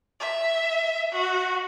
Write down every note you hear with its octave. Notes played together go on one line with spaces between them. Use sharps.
E5
F#4